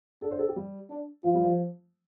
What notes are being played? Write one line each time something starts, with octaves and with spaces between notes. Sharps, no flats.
D4 A4
C5
A4
G4
G3
D4
F3 F4
G3
F3